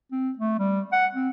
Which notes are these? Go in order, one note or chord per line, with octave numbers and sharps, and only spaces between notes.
C4
A3
G3
F#5
C4